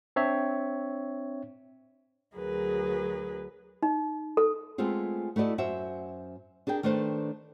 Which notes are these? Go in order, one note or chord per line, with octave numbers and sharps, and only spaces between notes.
C4 D4 C#5 E5
D2 F#3 G#4 A#4 B4
D#4
A4
G#3 A3 B3 C4 F4 G#4
A3 E4 F#4 D5 D#5
F#2 F#4 C5 E5
D4 G#4 A#4 G5
D#3 A3 D4 B4 C5